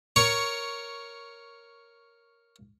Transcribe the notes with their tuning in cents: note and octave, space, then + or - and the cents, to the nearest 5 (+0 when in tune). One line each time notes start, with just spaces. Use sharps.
A#4 +0 C#5 +5 C#6 +0